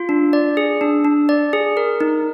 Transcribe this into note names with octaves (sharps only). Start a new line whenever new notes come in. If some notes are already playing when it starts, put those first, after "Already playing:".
Already playing: F4
D4
D5
G#4
D4
D4
D5
G#4
A#4
D#4